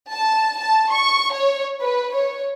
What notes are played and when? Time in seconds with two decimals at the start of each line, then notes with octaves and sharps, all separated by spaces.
0.12 A5
0.60 A5
0.93 C#6
1.33 C#5
1.81 B4
2.13 C#5